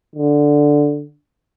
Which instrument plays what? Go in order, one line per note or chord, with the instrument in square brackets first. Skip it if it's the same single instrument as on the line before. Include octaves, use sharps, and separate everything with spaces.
[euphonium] D3